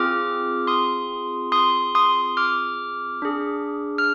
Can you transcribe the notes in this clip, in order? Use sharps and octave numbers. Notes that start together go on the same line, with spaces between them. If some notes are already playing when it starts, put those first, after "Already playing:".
Already playing: C4 F4 G#4 D6 F6
C6 D#6
C6 D#6
C6 D#6
D6 F6
D4 G#4
F6